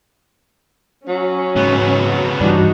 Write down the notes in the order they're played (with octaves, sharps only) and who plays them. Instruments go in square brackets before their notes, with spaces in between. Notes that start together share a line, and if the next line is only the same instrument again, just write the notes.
[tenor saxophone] F#3 [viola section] C#4
[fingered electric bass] G#2 [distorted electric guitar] C#3 B3
[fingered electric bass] G2 E3 [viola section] G3 D#4 F#4 [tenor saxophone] D4